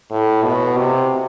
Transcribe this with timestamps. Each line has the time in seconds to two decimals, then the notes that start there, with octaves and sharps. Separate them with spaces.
0.11 A2
0.44 B2
0.77 C3